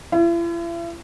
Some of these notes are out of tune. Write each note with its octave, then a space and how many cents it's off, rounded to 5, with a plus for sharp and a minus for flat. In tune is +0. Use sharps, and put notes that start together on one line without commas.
E4 +45